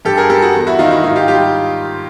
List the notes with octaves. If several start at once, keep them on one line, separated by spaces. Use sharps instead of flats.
G2 G4 A4
G#4 A#4
G3 G4 A4
F#4 G#4
E2
E4 F#4
D#3 D#4 F4
E4 F#4
G#2 D#4 F4
F4 G4
G3 F4 G4